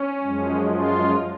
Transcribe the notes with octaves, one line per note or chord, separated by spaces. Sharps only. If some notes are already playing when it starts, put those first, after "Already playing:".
Already playing: C#4
F#2 F3 G#3
F4